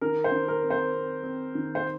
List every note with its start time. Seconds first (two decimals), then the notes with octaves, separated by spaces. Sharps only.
0.01 D#3 A#4
0.24 C5
0.32 D#3
0.48 A#4
0.63 C4
0.70 C5
0.94 C4
1.23 C4
1.55 D#3
1.75 C5